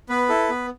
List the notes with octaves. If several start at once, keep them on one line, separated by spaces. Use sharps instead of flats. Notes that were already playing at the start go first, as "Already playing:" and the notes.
B3 B4
E4 A4
B3